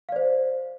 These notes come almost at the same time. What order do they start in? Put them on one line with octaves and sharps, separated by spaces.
F5 D5 C5